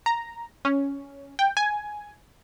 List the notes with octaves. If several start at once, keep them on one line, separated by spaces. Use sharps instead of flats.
A#5
C#4
G5
G#5